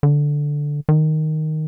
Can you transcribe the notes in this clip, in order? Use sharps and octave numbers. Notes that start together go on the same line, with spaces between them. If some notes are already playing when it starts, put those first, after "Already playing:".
D3
D#3